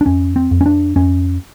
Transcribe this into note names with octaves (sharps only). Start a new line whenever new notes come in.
D4
F2 C#4
C4
F2
C#4
D4
F2 C#4